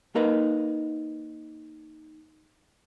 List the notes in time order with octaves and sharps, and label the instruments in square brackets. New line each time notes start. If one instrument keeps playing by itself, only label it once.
[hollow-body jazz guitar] A#3 D#4 A#4 B4 D#5